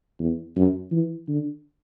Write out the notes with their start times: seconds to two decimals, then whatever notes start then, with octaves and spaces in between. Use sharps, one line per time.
0.19 E2
0.56 F#2
0.92 E3
1.28 D3